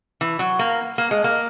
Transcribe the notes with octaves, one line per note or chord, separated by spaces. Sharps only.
E3
F#3
A#3
A#3
G#3
A#3